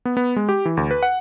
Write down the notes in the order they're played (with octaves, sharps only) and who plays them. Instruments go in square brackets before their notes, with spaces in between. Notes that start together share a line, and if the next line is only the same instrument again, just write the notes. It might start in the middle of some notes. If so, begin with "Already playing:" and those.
[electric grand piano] B3
B3
G#3
G4
E3
D2
B4
F#5